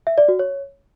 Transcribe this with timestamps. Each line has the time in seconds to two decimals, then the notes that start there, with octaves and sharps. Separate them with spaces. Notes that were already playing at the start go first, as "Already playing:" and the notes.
0.07 E5
0.18 D5
0.28 F#4
0.39 C#5